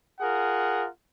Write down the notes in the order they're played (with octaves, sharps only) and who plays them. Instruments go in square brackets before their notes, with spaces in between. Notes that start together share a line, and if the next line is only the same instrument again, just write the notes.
[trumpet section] F4 G#4 A#4 F#5